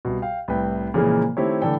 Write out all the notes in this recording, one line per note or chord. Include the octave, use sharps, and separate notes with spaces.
C2 B2
F5 G5
C2 A2 B4 G5
A#2 C#3 E3 F3 G#3 A#3
D#3 A3 C4 E4 G4 C#5
A2 D3 E3 A4 D5 G5